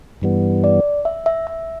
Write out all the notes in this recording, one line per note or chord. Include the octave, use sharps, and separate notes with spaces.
G2 E3 G3 B3
D5
E5
E5
E5